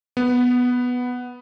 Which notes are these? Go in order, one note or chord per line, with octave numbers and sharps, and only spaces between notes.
B3